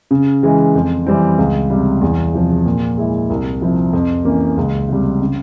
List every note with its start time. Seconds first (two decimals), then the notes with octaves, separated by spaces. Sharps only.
0.11 C#3
0.43 E3 G#3
0.75 F2
1.06 E3 G3 C4
1.39 C#2
1.70 C3 G3
2.01 E2
2.34 C3 F3
2.66 A#2
2.98 G#3 E4
3.30 C2
3.61 C3 F3 C4 E4
3.93 F2
4.25 E3 A#3 C#4
4.57 C#2
4.89 C3 G3
5.21 C#3